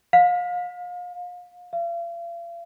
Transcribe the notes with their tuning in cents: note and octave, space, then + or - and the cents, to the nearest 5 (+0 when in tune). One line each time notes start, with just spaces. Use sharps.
F5 +35
F5 -40